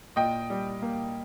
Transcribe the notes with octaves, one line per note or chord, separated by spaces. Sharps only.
A#2 D#5 G5
G3
A#3